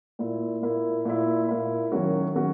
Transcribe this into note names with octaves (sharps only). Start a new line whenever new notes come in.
A#2 A#3 E4
A#2 A#3 E4
A#2 A#3 E4
A#2 A#3 E4
F#2 D#3 F#3 C#4 F#4
D#3 F#3 C#4 F#4